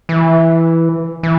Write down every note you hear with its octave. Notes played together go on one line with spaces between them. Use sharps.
E3
E3